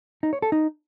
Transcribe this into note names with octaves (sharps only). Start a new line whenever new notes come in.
D#4
C#5
A4
D#4